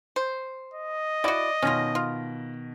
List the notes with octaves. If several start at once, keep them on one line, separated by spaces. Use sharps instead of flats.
C5
D#5
E4 F#4 D5
B2 D#3 C#4 F4 A#6
F4